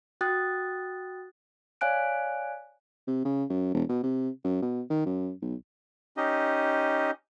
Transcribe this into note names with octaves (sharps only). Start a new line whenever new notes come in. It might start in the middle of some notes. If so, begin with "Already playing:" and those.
F#4 G5 D#6 F#6 A6
C#5 D5 F5 G#5 F#6 D7
C3
C#3
F#2
E1
B2
C3
F#2
B2
D#3
F#2
B1
C#4 D#4 G4 D#5